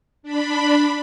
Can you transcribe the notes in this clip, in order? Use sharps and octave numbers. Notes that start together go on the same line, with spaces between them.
D4 B5